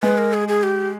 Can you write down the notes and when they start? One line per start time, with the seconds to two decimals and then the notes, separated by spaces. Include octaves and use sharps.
0.03 G#3 B4
0.18 A#4
0.33 G#4
0.48 G#4
0.63 G4